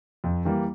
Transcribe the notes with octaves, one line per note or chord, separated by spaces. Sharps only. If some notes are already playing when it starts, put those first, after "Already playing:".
F2
E3 G3 A#3